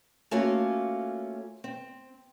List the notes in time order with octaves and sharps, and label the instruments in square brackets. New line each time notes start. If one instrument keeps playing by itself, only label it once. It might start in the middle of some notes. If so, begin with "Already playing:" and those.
[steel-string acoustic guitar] A3 A#3 C#4 F4 F#4 C#5
C4